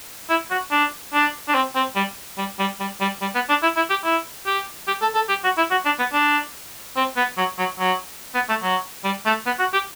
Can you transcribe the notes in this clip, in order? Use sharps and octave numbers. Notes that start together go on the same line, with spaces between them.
E4
F#4
D4
D4
D4
C4
C4
G3
G3
G3
G3
G3
G3
B3
D4
E4
E4
G4
E4
G4
G4
A4
A4
G4
F#4
E4
F#4
D4
B3
D4
C4
B3
F#3
F#3
F#3
B3
A3
F#3
G3
A3
B3
F#4
G4